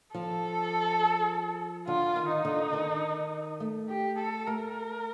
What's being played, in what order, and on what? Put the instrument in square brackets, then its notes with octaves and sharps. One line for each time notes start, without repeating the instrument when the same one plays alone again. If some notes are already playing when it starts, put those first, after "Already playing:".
[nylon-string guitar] F3 [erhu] A4
[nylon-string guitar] D3 [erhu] F4
[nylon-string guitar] D#3
[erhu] D#4
[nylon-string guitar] D3
D#3
A3
[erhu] G4
A4
[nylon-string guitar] A3 [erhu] A#4